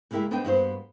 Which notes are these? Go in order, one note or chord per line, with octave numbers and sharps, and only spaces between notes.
C#3 G#3 A#3 E4 G4 A#4
B3 D4 D#4 C5 D#5 G5
G2 A#3 B3 F#4 A#4 C5